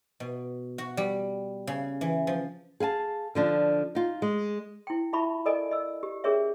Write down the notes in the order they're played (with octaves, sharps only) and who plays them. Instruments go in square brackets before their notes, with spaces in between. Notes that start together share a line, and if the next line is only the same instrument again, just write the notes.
[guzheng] B2
F#4
G3
C#3
E3
F3
[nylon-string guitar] G#4 F5 G#5 A5
D3 F3 D4
D#4 F4
G#3
[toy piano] E4 G5
E4 F4 E5 A5 B5 C#6
A4 A#4 D5 D#5 G#5
D#5 E6
G4
C#4 G#4 A#4 C#5 E5